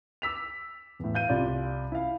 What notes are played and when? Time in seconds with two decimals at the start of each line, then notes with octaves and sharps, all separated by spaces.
0.22 D6 E6 B6 F7
0.99 E2 A2
1.15 F5 G6 D#7
1.29 C2 F4 D5
1.92 E4 F5